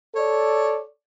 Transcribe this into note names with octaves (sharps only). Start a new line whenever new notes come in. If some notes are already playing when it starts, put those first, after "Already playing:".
A4 C#5 D5